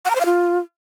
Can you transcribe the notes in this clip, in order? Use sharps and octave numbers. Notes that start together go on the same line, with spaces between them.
F#5
A#5
C5
F5
F4